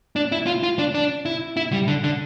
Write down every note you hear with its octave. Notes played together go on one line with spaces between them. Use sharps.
D4
E4
F4
F4
D4
D4
E4
E4
G3
D3
D3